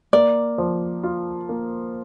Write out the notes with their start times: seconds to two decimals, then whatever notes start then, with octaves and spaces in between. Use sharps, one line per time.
0.13 A#3 D5
0.58 F3
1.03 F4
1.49 A#3